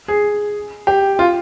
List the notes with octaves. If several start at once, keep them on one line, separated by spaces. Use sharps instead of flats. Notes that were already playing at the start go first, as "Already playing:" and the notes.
G#4
G4
F4